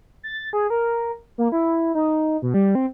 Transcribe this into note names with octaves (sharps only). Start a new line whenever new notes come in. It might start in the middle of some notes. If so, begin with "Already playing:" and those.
A6
G#4
A#4
A#3
E4
D#4
B2
G3
C4